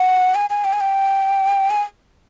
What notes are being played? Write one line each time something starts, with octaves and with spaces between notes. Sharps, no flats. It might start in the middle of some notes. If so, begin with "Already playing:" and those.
Already playing: F#5
G#5
G#5
G5
G#5
G5
G#5